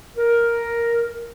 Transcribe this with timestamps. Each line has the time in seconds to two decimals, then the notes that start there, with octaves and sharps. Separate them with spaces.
0.17 A#4